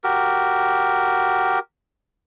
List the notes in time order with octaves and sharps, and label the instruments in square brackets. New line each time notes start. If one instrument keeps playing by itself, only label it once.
[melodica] F#4 G4 A#4